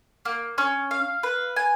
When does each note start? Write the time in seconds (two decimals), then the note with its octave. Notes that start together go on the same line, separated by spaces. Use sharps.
0.25 A#3
0.58 C#4
0.91 F5
1.23 B4
1.56 G#5